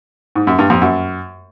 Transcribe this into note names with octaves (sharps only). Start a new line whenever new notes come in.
G#2
F#2
G2
F2
F#2